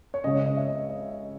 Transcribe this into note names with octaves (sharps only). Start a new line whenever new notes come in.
C#5
C#2 C#3 G#3 D#5
C#5
D#5
E5
D#5
D#5